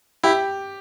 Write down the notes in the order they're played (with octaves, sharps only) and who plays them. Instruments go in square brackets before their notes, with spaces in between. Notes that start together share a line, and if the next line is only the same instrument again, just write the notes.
[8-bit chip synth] E4 [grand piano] G4